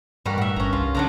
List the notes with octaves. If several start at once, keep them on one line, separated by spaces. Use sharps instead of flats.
G2 G3 F#4 A#4
A2 F#4 E5
G#1 C#4 A#5
C2 F4
C#3 F#3 D4 A#5